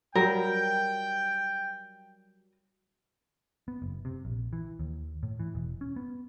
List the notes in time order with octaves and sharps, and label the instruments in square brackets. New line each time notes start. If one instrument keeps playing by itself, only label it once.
[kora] F#3 G3 [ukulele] A#4 [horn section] G5
[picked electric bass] B3
F#1
C3
A#1
E3
D#2
A2
E3
E1
C#4
B3